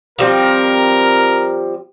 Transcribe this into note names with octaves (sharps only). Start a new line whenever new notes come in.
F3 G3 C4 A#4